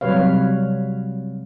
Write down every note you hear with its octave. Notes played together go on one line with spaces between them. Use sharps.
C3 F#3 G3 B4 C#5 F5